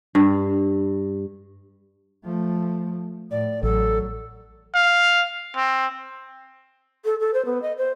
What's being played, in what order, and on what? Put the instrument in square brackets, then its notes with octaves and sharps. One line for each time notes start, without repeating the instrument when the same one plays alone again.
[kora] G2
[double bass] F3 A3
[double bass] A2 [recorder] D5
[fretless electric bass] A1 [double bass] F#3 [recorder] A4
[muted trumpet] F5
C4
[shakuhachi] A4
A4
C5
B3
D#5
C5